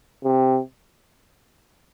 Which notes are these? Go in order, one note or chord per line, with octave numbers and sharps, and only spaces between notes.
C3